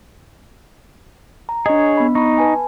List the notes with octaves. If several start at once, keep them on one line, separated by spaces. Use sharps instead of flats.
A#5
D4 G#4 C#5 D#5
B3 B5
D#4 B5 C#6
B4 G#5 A5